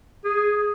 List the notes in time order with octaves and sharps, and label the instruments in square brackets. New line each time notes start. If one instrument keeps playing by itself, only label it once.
[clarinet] G#4